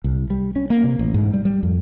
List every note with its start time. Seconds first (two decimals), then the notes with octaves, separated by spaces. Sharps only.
0.04 C2
0.30 G3
0.56 C#4
0.70 A#3
0.84 C3
0.99 A1
1.14 G#2
1.34 G3
1.45 G3
1.63 F2